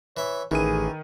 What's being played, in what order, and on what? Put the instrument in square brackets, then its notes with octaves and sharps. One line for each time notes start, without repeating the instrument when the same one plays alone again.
[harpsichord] E3 E5 [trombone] C#5
[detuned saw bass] A1 [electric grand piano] D#3 D#7 [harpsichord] E3 [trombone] G#4